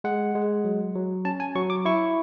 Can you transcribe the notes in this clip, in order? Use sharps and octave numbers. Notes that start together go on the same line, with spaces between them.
G#3 F#5
G#3
F#3
F#3
C#4 A5
G#5
F#3 C#6
D6
E4 C#6